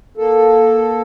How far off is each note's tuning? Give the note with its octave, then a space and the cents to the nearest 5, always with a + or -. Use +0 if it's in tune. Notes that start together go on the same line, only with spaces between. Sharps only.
A#3 +10 A4 +0